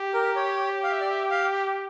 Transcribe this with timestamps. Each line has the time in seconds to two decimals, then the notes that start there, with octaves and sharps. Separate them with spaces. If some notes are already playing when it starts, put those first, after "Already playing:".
Already playing: G4
0.14 A#4
0.36 C#5
0.83 F5
0.92 E5
1.00 D5
1.10 E5
1.30 F5
1.54 G5